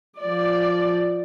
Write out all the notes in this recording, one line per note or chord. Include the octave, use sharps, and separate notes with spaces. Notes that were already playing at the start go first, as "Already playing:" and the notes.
F3 D5